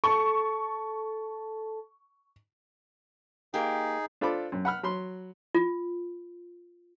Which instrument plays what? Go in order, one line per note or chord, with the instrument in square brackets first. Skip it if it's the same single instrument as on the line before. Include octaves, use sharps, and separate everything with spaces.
[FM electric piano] A4 A5 [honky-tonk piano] C#6
[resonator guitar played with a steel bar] A#3 G4 [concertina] D#4 G#4
[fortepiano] D4 F4 A4 C5 B5 D6
F#2
F#5 B5 F6
F#3 B5 C6
[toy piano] F4